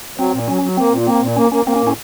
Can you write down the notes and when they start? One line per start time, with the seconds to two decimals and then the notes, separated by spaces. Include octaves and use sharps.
0.18 F#3 C4
0.33 A#2
0.48 F#3 C#4
0.63 F#3
0.77 A#3 C4
0.92 A#2
1.07 A#3 C4
1.22 A#2
1.36 A#3 C#4
1.52 A#3 C#4
1.66 A#3 C4
1.76 C#4
1.82 A2
1.87 C#4